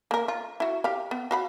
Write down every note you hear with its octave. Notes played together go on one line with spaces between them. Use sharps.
A#3 A#4
F4
E4 F#4
G4 F5
B3
F#4 F5 B5